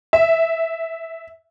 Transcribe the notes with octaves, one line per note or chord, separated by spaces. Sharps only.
E5